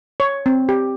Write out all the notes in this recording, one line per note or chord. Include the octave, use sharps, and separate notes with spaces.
C#5
C4
G4